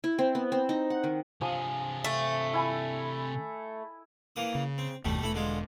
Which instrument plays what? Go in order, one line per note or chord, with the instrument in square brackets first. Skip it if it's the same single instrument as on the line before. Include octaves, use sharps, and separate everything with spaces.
[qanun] E4
C4
B3
C4
D#4
F#5
D#3
[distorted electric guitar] C3 D4 [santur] F3 G#5 D#6
[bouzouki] A3
[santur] E4 G#5 B5
[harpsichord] E3 A#3 D#6
[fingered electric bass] C#3
[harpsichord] C4
[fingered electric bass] F#1 D#2 [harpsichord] B2 G3 A3
[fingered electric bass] E1 [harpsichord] A3 E4 B5
[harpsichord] D3 G#3 F4